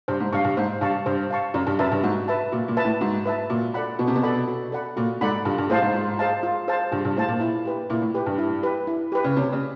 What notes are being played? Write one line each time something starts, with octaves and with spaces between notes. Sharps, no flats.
G2 C5
G#2
G2 F5 A5 C#6
G2
G#2 C5
G2 F5 A5 C#6
G2 C5
F5 A5 C#6
F#2 F#4
G2
F#2 B4 E5 A5
G2
G#2 F#4
B4 E5 A5
A#2 F#4
A#2
B4 E5 A5
A2
G#2 F#4
B4 E5 A5
A#2 F#4
A4 D5 F#5 B5
B2 F#4
C3
B2
A4 D5 F#5 B5
F#4
A4 D5 F#5 B5
A#2 F#4
G#2 A4 D5 F#5 B5
G2 F4
G2
A2 G#4 C5 F5 A5
G#2
F4
G#4 C5 F5 A5
F4
G#4 C5 F5 A5
G2 F4
G2
A2 G#4 C5 F5 A5
A#2
E4
G4 B4
A#2 E4
A2
G4 B4
G2
E4
G4 B4
E4
G4 B4
C#3
C3 C#4
C#3